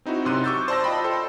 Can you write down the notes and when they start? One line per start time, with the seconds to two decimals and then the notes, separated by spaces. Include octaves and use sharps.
0.05 C4 D#4 E4 F#4
0.25 F#2 C3 C6 F#6 D#7
0.44 C#6 D6 E6 G6 A6
0.68 C5 D5 A5 E6 A#6
0.84 F4 D#5 G5 B5
1.04 A4 C5